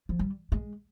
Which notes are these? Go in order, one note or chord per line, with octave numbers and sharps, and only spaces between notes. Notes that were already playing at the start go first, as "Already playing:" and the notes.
F3
G3
G#3